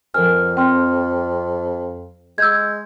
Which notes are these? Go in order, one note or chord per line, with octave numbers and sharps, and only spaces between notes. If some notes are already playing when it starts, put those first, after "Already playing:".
F2 F3 A#4 G#5 F6
C4 G5 C6 F6
G#3 E6 G6 G#6